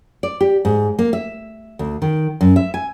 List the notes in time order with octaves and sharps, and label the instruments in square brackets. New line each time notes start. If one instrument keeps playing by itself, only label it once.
[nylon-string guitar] D5
G4
G#2
A#3
E5
D2
D#3
F#2
E5
G#5